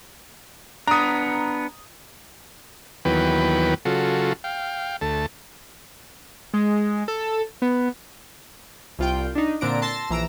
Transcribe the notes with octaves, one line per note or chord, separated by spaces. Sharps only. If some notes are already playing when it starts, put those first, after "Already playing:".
B3 D4 A#5 D#6
D#2 E3 F#3 B3 B4 G5
C#3 F#3 F4 F#4 A4
F5 G5
D2 A3 A5
G#3
A4
B3
C2 F4 G5
D4 D#4
A#2 D3 C4 D4 A#5 D7
A5 C6 E6 A6 A#6
A#1 E3 A#5 E6 D7